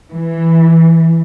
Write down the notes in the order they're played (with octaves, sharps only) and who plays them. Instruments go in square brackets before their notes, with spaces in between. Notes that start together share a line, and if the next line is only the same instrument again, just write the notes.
[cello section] E3